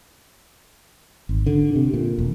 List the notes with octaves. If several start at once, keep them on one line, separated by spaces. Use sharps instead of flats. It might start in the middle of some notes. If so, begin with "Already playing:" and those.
G#1
D3
C3
A#2
E1